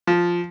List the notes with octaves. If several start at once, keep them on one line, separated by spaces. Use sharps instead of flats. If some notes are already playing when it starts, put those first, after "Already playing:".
F3